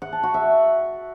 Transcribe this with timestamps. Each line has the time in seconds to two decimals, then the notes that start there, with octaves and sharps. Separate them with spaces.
0.02 F#5
0.12 A5
0.23 F#4
0.34 E5